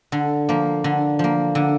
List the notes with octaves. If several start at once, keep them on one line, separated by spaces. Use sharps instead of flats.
D3
F3 A#3
D3
F3 A#3
D3